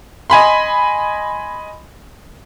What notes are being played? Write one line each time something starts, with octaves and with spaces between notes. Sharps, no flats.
D#5 G#5 B5 C6